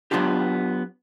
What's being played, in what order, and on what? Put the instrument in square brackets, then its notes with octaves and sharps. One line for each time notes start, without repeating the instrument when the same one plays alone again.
[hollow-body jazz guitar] F#3 G#3 B3 D4 F4 G4